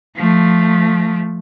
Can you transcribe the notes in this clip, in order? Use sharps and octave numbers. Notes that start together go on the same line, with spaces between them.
F3 A3